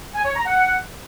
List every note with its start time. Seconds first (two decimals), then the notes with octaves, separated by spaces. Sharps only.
0.14 G#5
0.25 C#5
0.35 A#5
0.46 F#5